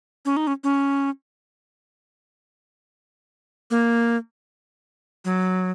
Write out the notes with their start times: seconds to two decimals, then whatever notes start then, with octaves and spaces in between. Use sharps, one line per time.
0.25 C#4
0.37 D#4
0.47 C#4
0.64 C#4
3.71 A#3
5.25 F#3